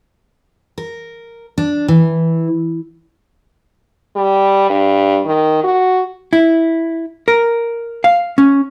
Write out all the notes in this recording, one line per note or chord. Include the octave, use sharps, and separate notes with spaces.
A#4
D4
E3
G3
G2
D#3
F#4
E4
A#4
F5
C#4